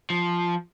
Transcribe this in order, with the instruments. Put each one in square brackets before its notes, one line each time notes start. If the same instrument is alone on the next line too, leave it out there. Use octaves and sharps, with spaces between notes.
[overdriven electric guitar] F3